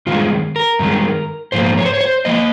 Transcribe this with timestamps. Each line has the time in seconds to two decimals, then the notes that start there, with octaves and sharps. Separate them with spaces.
0.07 G2 D#3 G#3 F4
0.56 A#4
0.79 G2 D#3 G#3
1.52 G#2 F3 A#3 C5
1.77 C#5
1.86 C5
1.94 C#5
2.01 C5
2.25 F3 A#3 D#5